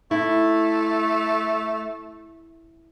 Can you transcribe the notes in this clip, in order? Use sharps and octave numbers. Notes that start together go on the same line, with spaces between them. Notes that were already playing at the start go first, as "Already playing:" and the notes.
A3 E4